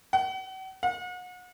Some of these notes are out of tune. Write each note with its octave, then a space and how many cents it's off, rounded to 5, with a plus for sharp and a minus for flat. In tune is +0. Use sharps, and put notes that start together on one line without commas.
F#5 +45
F#5 -35